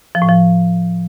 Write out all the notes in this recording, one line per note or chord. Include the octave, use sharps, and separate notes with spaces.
F3
A2
F3